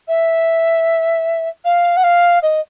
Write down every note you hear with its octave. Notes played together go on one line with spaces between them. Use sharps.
E5
F5
F#5
F5
D#5